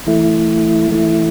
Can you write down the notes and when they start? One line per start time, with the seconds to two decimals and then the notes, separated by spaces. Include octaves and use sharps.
0.07 E3 A3 E4
0.90 E3 A3 E4